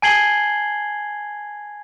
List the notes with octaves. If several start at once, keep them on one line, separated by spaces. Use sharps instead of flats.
G#5 A5 G#6 C7 F#7 G7